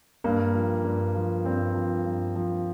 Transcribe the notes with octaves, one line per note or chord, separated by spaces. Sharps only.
G2 A#3
F3
G2
F3
G2 C4
F3
G2
F3